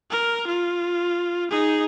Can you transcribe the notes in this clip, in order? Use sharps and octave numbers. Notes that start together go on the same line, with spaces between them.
A#4
F4
D#4 G#4